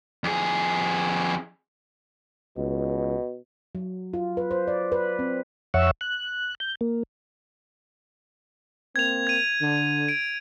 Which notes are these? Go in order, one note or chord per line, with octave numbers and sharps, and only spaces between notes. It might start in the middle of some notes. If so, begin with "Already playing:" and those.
F2 G#4
C#2 B2
F#3
F4
B4
C5
D5
B4
C4
F2 C#5 E5 F#5 C#6 E6
F#6
G6
A#3
A#3 C4 G#6 F7
G#6 D#7
D3
D7